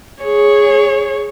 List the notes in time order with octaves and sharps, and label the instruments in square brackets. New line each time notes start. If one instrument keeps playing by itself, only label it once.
[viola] G#4 C#5